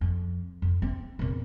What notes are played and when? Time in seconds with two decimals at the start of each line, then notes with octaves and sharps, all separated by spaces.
0.01 F2
0.62 F2
0.82 C4
1.19 E2 A#2